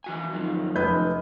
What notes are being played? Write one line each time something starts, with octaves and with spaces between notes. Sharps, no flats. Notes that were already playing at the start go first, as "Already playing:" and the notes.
E3 F#4 G#5
F#2 D#3 F3
F1 B4 G6